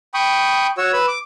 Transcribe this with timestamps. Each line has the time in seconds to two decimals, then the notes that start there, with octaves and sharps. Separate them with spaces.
0.14 G5 B5 C#6 D#6
0.78 F#4 C#5 E6
0.93 B4 B5 E6
1.08 D6